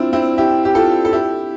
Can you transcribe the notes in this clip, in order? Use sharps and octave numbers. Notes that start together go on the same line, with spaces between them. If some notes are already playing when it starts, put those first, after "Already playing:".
Already playing: C4 D4 E4 F4
C4 E4
E4 G4
G4
F4 A4
A4
E4 G4